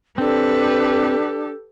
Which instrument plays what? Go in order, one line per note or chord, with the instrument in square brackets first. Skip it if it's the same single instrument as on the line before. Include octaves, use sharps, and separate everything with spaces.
[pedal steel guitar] C4 [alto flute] D4 [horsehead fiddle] G4 A4 [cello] B4